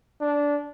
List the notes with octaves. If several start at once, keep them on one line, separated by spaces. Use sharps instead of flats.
D4